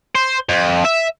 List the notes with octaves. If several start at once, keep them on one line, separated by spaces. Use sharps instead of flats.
C5
F2
E5